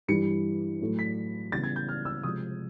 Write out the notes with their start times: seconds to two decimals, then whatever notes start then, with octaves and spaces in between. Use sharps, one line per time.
0.08 G2 E3 G3 C#7
0.81 A2 F#3 A3
0.99 B6
1.52 C#3 E3 G3 B3 A6
1.64 G#6
1.76 G6
1.89 F6
2.05 E6
2.23 C3 F3 G#3 D#6